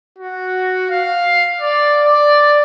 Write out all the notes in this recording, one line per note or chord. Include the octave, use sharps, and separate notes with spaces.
F#4
F5
D5
D5